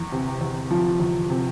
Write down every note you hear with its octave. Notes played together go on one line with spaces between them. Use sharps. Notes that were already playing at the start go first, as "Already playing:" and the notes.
Already playing: E2
C3
E2
F3
E2
C3